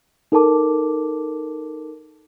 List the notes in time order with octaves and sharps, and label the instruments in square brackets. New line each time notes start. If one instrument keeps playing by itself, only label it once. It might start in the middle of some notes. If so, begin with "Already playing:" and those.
[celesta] D#4 A4 A#4 A5 D6